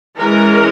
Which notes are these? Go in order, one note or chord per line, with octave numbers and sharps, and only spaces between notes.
E3 G#3 C#4 A#4